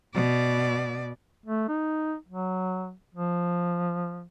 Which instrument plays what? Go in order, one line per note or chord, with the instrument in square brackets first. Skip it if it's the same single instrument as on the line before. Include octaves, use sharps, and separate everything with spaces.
[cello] B2 D5
[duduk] A3
D#4
F#3
F3